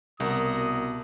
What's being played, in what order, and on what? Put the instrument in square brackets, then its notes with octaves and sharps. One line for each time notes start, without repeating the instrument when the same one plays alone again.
[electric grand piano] C2 [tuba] B2 [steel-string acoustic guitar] F#4 A#4 [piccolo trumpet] D#6